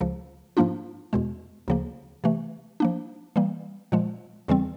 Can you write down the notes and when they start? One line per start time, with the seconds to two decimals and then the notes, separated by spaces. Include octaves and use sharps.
0.01 C#2 C#3 F3
0.57 G#2 F3 A#3 D4 F4
1.13 E2 B2 G#3
1.68 D2 C#3 F3 A#3
2.24 C3 E3 A3
2.80 F3 A#3 D4
3.36 E3 G3 A#3
3.92 A#2 F3 G#3
4.48 E2 C#3 E3 G3 C4